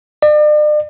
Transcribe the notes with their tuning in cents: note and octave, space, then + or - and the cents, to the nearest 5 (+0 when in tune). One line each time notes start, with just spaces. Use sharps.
D5 +40